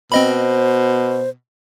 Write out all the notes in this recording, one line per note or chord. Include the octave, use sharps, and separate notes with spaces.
B2 C4 C5 D#5 B5